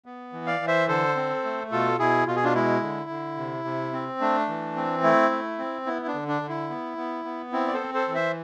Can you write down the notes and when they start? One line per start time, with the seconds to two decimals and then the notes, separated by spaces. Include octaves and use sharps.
0.06 B3
0.33 E3
0.47 D5 F5
0.60 E3
0.68 C5 E5
0.88 D3 A4 C5
1.16 C4
1.44 A3
1.71 B2 F4 A4
1.99 B2 E4 G#4
2.27 B2 F4
2.36 G#4
2.44 D4 F4
2.55 G#3 E4
2.82 D3
3.10 D3
3.37 C3
3.65 C3
3.93 C4
4.21 A3 D4
4.48 E3
4.76 C4
5.03 A3 E4
5.31 A3
5.58 C4
5.86 B3 E4
6.02 E4
6.08 D4
6.14 D3
6.28 D4
6.42 D3
6.49 E4
6.70 B3
6.97 B3
7.25 B3
7.53 C4 E4
7.67 D5
7.74 A4 C5
7.80 C4
7.94 A4 C5
8.08 E3
8.15 C5 E5